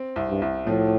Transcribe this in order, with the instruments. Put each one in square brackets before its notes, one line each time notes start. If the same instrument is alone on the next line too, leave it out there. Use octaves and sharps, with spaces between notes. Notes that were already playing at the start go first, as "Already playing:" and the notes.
Already playing: [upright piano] C4
C2
[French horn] G2
[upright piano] C2
[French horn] A2 [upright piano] F3